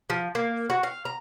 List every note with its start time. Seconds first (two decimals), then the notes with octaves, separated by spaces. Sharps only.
0.10 F3
0.35 A#3
0.70 F#4
0.83 F5
1.05 A#5